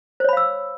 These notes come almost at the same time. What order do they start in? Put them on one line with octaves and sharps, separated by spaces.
C5 C#5 B5 F5 E6